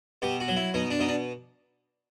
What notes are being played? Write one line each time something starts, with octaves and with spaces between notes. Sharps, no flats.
B2 G4
F#4
F#3
E4
B2 D#4
D4
B2 D#4
D4